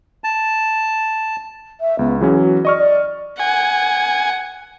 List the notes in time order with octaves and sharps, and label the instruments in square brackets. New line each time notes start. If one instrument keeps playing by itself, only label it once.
[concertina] A5
[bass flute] E5
[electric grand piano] C#2 [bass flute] B3
[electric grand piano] E3 F#3 C#4 [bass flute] G#4
[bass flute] F#4
[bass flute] D5 [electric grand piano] D#5 C#6 F6
[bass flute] D5
[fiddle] F#5 [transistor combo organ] G#5